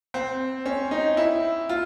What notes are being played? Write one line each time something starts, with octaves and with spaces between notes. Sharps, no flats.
C4
C#4
D#4
E4
F4